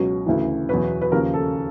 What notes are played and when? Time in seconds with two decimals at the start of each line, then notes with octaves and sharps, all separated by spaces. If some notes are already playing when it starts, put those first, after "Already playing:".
Already playing: C#2 B2 F#3
0.26 D2 C#3 E3
0.69 E2 B2 F#3 B4
1.01 B4
1.12 D#2 C#3 F3 A#4
1.34 A4